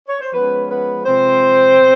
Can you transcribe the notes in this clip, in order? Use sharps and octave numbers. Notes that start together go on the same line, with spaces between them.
C#5
C5
F3 G#3 B3 C#4 B4
B3 B4
C3 F3 G#3 C4 C5
B2